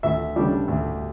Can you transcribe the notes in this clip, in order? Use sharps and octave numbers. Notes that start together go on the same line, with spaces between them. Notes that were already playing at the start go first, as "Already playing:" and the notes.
D2 E5
C#3 G3 D4
D2